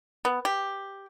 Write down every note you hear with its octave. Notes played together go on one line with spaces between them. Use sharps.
B3
G4